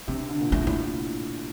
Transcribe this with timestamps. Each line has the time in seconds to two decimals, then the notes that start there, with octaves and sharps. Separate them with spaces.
0.08 C3 D4
0.29 D3
0.41 A#2
0.52 A2 E4
0.67 E4